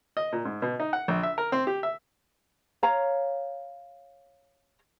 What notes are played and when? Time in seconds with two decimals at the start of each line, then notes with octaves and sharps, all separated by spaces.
0.17 D#5
0.32 A#2
0.45 G#2
0.62 B2
0.80 D#4
0.93 F#5
1.08 A#1
1.23 E5
1.38 A#4
1.52 C4
1.67 G4
1.83 E5
2.83 C#5 F5 A#5